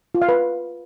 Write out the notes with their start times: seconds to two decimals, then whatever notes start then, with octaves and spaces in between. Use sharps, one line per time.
0.15 F4
0.22 F5
0.29 B4